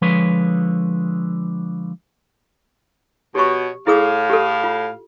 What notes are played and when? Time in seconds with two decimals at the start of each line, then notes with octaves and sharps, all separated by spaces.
0.02 D3 F3 G#3 B4 C#5
3.35 B2 G4 C#5 C#6
3.87 A2 E4 G#4 F5 D#6
4.30 G4 A4
4.64 F4